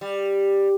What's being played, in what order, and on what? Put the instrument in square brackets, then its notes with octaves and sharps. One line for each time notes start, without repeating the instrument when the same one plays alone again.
[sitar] G3